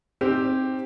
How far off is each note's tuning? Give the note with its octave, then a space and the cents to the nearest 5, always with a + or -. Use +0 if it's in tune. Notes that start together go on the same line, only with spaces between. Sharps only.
C4 +5 D#4 +5 G4 +0